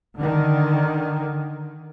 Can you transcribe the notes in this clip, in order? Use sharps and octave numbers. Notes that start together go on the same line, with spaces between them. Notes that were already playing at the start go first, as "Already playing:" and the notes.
D3 D#3